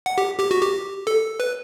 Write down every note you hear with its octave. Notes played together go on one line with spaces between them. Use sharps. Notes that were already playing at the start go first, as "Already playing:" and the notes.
F#5
G4
G4
F#4
G4
A4
B4